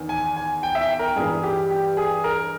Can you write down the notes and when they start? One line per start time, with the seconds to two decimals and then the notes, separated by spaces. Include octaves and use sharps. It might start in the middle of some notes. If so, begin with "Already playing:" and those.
Already playing: E2 D#3
0.09 G#5
0.37 G#5
0.63 G5
0.75 E5
0.81 G5
0.99 A#4
1.16 G2 E3 G#4
1.43 G4
1.71 G4
1.97 G#4
2.24 A#4